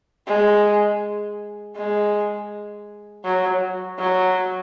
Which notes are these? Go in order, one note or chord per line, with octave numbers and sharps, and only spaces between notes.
G#3
G#3
F#3
F#3